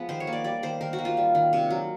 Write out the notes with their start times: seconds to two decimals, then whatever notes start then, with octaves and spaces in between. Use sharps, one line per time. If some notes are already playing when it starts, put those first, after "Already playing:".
Already playing: F3 G#3 B3
0.09 D#3 C5
0.20 C#5
0.27 A#3
0.33 D5
0.44 G3 D5
0.63 D#3 C5
0.81 D#3 A#4
0.93 F#4
0.99 A#3
1.05 F4
1.17 G3
1.35 D#3
1.53 C3
1.70 F#3